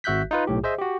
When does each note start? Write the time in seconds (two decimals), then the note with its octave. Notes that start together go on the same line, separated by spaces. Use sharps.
0.04 G#1 F#4 E5 F#6 G6 B6
0.31 D#4 F4 B4
0.47 B1 A2 G4
0.64 G#4 C5 D#5 E5
0.78 F#4 G4